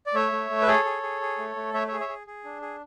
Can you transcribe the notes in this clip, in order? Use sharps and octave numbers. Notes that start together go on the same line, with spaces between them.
D5
A3 C#5 E5
A3
A3
B4
G#4 A4 C#5
G#4
G#4
G#4
A3
A3
A3 C#5 E5
C#5 E5
G#4
C#5 E5
G#4
G#4
D4
G#4